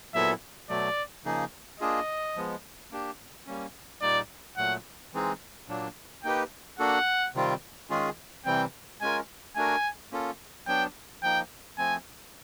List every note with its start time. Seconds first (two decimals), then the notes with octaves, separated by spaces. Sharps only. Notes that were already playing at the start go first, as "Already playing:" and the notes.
0.14 A#2 F#3 B3 E4 A4 E5
0.70 B2 F#3 A3 D5
1.25 C#3 F3 A#3 D#4 G#4
1.80 A#3 D4 F4 G#4 D#5
2.36 F3 G#3 B3
2.92 A#3 D4 G4
3.47 G3 A#3 C#4
4.02 A#2 G3 A#3 D#4 D5
4.57 A#2 F#3 A3 F#5
5.13 E3 G#3 C4 D#4 G#4
5.68 A#2 F#3 A#3 D4
6.24 A#3 D#4 G4 B4 G5
6.79 A#3 D4 F#4 A4 F#5
7.35 C3 D#3 G3 C4 F4
7.90 D#3 G#3 C#4 F4 G#4
8.46 C3 E3 G3 C4 G5
9.01 G#3 C#4 F4 A#4 G#5
9.56 A3 D4 F#4 A#4 G#5
10.12 A#3 C#4 F4 A4
10.67 F#3 B3 D4 G5
11.23 F3 A#3 D#4 G5
11.78 F3 A3 C4 G#5